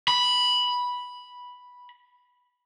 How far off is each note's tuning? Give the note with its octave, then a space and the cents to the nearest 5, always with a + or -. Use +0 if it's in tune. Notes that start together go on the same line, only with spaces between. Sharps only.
B5 -5